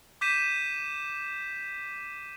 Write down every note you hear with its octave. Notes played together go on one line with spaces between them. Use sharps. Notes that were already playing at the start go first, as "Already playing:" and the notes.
D6 G6 B6 D#7 E7